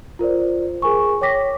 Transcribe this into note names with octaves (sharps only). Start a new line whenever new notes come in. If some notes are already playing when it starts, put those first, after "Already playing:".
F4 A#4 C5 D5
G#4 A#4 G#5 C#6
C#5 G5 D6 A#6 B6